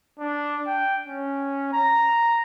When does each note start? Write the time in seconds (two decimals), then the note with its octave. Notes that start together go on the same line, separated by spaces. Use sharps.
0.19 D4
0.66 G5
1.07 C#4
1.73 A#5